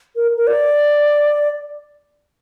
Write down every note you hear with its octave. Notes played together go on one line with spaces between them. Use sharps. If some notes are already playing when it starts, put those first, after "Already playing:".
A#4
A#4
D5